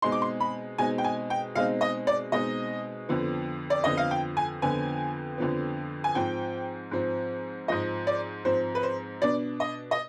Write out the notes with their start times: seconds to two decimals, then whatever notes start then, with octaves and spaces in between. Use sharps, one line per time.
0.02 B2 G#3 C4 D#4 C6
0.12 D6
0.22 C6
0.40 B5
0.78 B2 G#3 C4 D#4 G#5
0.98 G5
1.04 G#5
1.30 G5
1.55 B2 G#3 C4 D#4 F5
1.81 D#5
2.07 D5
2.32 B2 G#3 C4 D#4 D#5
3.09 F2 D3 F3 B3
3.70 D5
3.84 F2 D3 F3 B3 D#5
3.97 F5
4.11 G5
4.37 G#5
4.62 F2 D3 F3 B3 G#5
5.38 F2 D3 F3 B3
6.04 G#5
6.15 G#2 F3 C4 G5
6.91 G#2 F3 C4
7.68 G#2 F3 C4 D#5
8.07 D5
8.45 G#2 F3 C4 C5
8.75 B4
8.83 C5
9.22 B2 B3 D4 D5
9.60 D#5
9.91 D#5